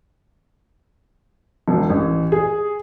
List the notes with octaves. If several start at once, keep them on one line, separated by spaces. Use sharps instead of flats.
E1
A1
G#4